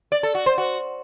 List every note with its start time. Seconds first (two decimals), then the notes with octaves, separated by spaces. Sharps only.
0.12 D5
0.23 A4
0.35 F#4
0.46 C5
0.58 F#4